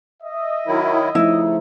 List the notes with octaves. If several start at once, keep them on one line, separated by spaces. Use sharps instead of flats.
D#5 E5
D#3 F#3 E4
C#3 F3 A3 D#4 E4